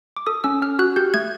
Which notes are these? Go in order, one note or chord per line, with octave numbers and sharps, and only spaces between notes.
D6
A4 D#6
C#4 E6
C#4 F6
F#4 F#6
G4 G6
A3 G#6